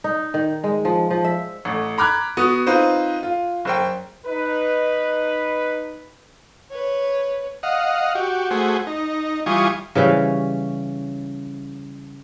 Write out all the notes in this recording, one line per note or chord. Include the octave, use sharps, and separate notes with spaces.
D#4
D#3
G#3
F3
F3
E5
A1 A3
A#5 B5 D6 F6 F#6 G#6
B3 F#4 D#6
C4 D#4 F4 B4 C5
F4
F#1 C5 G5
D#4 B4
B4 C#5
D#5 F5 F#5
F#4 G4
A3 F#4 G#4 C5
D#4
E3 G3 F4 G#5 C#6 D#6
C#3 E3 G3 C#4